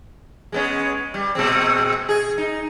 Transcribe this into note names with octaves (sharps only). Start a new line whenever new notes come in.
G#3 B3 C#4
G3
A#2 G#3 C4
G#4
D#4